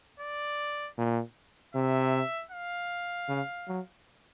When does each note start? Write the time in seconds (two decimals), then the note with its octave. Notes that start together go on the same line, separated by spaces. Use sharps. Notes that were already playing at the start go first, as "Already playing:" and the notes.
0.20 D5
0.98 A#2
1.74 C3 E5
2.51 F5
3.29 C#3
3.68 F#3